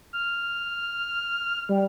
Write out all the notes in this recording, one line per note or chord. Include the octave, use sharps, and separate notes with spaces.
F6
G3